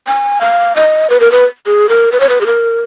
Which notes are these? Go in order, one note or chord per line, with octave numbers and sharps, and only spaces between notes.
G#5
F5
D#5
B4
A#4
B4
G#4
A#4
B4
C#5
B4
G#4
A#4